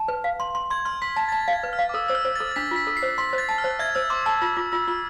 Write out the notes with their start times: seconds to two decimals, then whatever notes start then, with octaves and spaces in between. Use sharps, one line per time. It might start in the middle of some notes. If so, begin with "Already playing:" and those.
Already playing: A5
0.08 B4
0.24 F5
0.40 C6
0.55 C6
0.70 C6 G#6
0.85 C6 F6
1.02 C6 B6
1.16 A5 A6
1.29 A6
1.32 A5 B6
1.48 F5
1.53 G#6
1.63 B4
1.73 F6
1.79 F5
1.89 D6
1.94 A4 E6
2.08 C5 E6
2.15 F6
2.25 C5
2.36 A6
2.40 A4
2.52 A6
2.56 D4 B6
2.71 F4 B6
2.87 A4
2.97 C7
3.03 C5
3.18 C6 B6
3.33 C5
3.38 A6
3.49 A5
3.58 F6
3.64 C5
3.79 E5 G#6
3.95 C5 E6
4.10 C6 D6
4.26 A5 E6
4.42 F4 E6
4.57 F4 D6
4.72 F4 E6
4.88 F4 F6